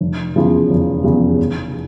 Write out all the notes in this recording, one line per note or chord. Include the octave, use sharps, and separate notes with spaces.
F1
E2 C#3 F3
F1
E2 C#3 F3
F1